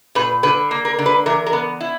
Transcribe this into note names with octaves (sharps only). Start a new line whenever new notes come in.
A#2 B4
D3 B4
A#3
A#4
D3
B4
E3 A#4
A#4
B3
E4